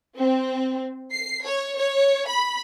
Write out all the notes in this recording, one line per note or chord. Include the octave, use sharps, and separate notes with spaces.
C4
C7
C#5
C#5
B5